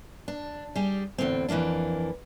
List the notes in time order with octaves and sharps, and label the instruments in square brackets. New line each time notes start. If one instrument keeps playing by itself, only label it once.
[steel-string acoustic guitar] D4
G3 G4 G#4
E2 A2 D3 C4
F2 E3 G3 A#3 D4